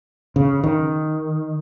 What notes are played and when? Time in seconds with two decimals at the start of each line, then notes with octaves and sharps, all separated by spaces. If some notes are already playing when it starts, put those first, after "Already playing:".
0.36 C#3
0.64 D#3